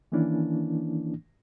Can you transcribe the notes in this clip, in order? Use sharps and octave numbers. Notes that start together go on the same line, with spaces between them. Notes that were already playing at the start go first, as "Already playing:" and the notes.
D#3 E3 A#3 C#4 D4 E4